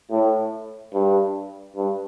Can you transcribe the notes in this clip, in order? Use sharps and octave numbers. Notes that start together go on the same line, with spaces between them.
A2
G2
G2